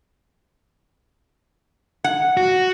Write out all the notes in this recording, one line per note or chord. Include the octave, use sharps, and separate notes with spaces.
F#5
F#4